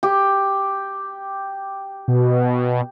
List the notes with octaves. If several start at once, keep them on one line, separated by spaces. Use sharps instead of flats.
G4
B2